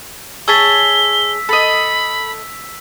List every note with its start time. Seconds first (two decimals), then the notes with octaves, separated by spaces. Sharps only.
0.48 G#4 C#5 A5 E6 B6 G7
1.49 A4 D#5 B5